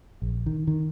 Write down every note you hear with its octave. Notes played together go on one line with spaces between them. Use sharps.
A#1
D#3
D#3